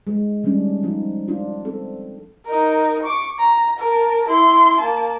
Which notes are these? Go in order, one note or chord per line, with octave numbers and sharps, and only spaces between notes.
G#3
D#3 G3 G#3 C#4 D4
F3 D#4 F4
D4 F4
C4 A4
D#4 A#4
C#6 D6
A#5
A#4 A5
E4 C6
A#3 A5